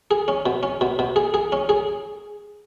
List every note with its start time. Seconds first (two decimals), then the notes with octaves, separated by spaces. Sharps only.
0.11 G#4
0.28 C#4
0.46 B2
0.63 C#4
0.81 B2
0.99 B2
1.16 G#4
1.34 G#4
1.52 C#4
1.69 G#4